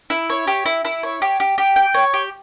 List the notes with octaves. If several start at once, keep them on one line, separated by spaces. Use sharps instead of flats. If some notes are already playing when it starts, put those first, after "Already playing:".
E4
C#5
G4
E4
E4
C#5
G4
G4
G4
G5
C#5
G4